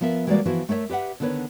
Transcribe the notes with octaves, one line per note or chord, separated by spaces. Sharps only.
F3 B3 A#4 E5
E3 G3 G#3 A#3 F#4 D5
E3 F3 B3 E4 F#4
A3 A#4 C#5 D5 E5
G4 B4 E5 F#5
D3 D#3 B3 B4 C#5